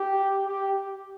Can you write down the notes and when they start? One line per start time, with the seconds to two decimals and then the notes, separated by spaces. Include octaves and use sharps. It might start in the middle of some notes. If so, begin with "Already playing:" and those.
Already playing: G4
0.46 G4